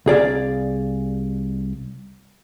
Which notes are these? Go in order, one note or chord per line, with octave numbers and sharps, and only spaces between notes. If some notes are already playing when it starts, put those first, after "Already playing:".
C2 G#4 D5 F5